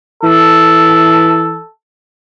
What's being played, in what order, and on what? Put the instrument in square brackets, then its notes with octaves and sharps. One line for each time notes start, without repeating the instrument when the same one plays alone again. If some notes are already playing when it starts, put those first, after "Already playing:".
[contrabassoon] E3 [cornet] A4